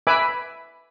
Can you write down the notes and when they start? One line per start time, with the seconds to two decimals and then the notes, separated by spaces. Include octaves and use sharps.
0.07 B4 E5 G#5 B5 D6